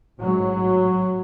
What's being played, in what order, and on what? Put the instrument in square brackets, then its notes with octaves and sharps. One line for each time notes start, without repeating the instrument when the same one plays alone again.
[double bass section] A1 G#2 F#3